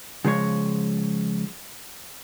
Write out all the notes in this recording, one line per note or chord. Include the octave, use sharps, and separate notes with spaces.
C#3 F3 G#3 C#5